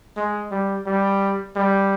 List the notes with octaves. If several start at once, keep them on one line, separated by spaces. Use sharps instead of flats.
G#3
G3
G3
G3